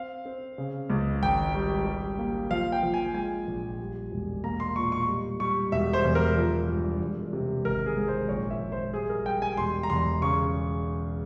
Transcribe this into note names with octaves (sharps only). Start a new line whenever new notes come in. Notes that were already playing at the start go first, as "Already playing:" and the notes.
Already playing: C4 F5
C4
C#3
C#2
G#1 G5
G3
G3
A#3
F3 F5
G5
F3
G#5
G#3 G#5
A#1
G3
E1
A#3 A#5
C6
A#2 C#6
C#6
G3
G3 C#6
E1 E5
C5
E2
A#4
F3
G2
E1
C3
G#1 A#4
G#4
G#2
C5
A#1 C#5
E5
A#1
C5
G3 G#4
A#4
G3 G5
G#5
E1 C6
A#5
E2 C6
C#3 C#6